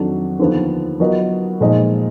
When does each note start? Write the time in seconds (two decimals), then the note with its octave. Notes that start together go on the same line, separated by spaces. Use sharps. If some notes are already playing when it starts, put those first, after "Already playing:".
Already playing: F2 D#3 F#3 D4
0.39 D#2 D3 F3 B3 F4
1.00 F#3 B3 F4 A#4 D#5
1.61 A#2 F3 G#3 D#4